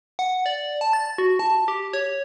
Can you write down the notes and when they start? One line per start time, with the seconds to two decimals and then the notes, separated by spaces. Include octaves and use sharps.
0.19 F#5
0.46 D5
0.81 A5
0.93 A6
1.18 F#4
1.39 A5
1.68 G4
1.93 C#5